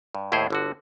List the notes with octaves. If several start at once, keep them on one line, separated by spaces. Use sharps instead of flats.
G2
D#2 A2 E4 G#4 C5
G1 D3 F#4